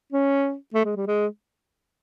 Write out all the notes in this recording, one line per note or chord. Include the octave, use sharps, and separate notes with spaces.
C#4
A3
G#3
G3
G#3